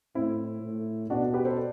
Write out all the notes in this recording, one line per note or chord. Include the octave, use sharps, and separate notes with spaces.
A2 C4 E4
A2
B2 D4 F#4
G4 B4
A4 C5
D5